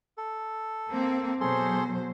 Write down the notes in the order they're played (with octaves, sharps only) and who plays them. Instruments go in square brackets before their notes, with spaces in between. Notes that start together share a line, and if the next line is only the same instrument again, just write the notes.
[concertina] A4
[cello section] A#3 C4
[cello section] B2 F#3 C5 [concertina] G#4 A4 C6